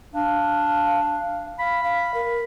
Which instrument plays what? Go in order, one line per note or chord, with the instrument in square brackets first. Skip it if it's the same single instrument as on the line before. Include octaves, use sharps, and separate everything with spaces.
[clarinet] D4 [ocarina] F5
[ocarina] F5 [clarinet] B5
[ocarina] F5
A#4